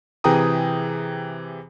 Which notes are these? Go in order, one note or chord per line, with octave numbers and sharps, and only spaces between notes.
C3 E3 G#4 G5 A#5 D#6